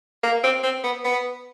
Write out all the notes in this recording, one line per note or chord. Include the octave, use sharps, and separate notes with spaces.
A#3
C4
C4
B3
B3